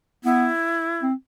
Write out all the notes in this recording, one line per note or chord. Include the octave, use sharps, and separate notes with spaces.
B3 E4
C4